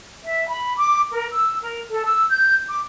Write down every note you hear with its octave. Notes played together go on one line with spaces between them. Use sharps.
E5
B5
D6
A#4
E6
A#4
A4
E6
G6
D6